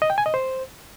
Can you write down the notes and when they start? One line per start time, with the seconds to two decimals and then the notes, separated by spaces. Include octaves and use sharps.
0.02 D#5
0.10 G5
0.18 G#5
0.26 D#5
0.34 C5